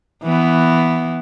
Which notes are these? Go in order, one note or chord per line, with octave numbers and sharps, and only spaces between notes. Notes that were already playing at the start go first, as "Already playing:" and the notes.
E3 B3